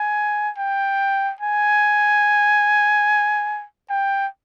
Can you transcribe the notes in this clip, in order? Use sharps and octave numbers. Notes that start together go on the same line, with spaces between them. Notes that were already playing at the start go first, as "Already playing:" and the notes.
Already playing: G#5
G5
G#5
G5